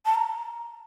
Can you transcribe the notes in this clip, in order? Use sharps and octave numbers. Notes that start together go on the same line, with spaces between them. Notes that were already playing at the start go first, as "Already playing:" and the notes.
A5
A#5